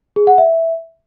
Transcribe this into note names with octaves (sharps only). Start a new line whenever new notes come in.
G#4
F#5
E5